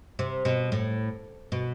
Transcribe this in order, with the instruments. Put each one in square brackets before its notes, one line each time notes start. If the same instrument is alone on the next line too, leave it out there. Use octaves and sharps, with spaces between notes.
[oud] C3
B2
A2
B2